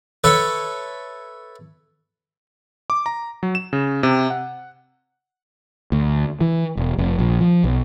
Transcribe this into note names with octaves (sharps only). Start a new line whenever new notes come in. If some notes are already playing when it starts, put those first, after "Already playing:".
A4 B4 C#5 E5
D6
A#5
F#3
E7
C#3
C3
F#5
D2
E3
E1
F1
A#1
F3
B1